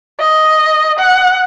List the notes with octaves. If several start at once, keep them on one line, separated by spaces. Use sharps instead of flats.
D#5
F#5